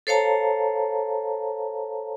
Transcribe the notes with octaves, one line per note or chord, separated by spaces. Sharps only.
A4 C5 C#5 F5 A5 A#5